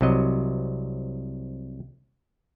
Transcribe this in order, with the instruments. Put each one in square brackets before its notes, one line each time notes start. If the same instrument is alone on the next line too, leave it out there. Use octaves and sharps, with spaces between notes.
[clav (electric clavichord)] C2 C3 F#3 D#5